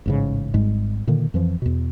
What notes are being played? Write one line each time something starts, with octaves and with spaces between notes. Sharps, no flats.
A1 G#2 C#3
G#1 G#2 G3 G#3
A#2 D3 D#3 A#3
F2 E3 F3
E2 B2